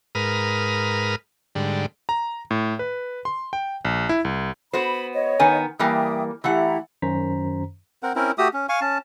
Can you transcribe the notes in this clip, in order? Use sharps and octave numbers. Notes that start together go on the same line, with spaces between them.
G#2 A#4 B4 D#6 F6
G#2 D3 G3
A#5
A2
B4
C6
G5
A#1
E4
C2
B3 F#4 C5 B5
C#5 D#5
D#3 B3 G#5
E3 G3 A#3 E5 G5 D#6
E3 A3 E4 G4 F#5 A#5
F#2 D#3 C#4 C5 A#5 B6
C4 A#4 F#5
C4 C#4 E4 A#4
A3 F#4 G4 D#6
C#4
F5 G#5 C#6
C#4 A5